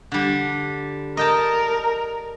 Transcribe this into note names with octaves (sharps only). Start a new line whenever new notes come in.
D3 G3
A#4 D#5 G5 A5